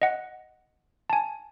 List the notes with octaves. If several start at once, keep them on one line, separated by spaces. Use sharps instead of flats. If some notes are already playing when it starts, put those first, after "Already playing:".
D#5 F#5
G#5 A5